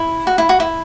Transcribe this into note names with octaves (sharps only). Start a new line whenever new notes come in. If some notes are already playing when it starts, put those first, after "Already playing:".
Already playing: E4
F#4
E4
F#4
E4